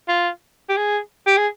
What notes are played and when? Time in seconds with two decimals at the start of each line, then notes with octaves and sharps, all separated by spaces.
0.08 F4
0.69 G4
0.77 G#4
1.27 G4
1.37 G#4